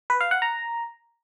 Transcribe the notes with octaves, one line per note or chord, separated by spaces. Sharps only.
B4
F5
F#5
A#5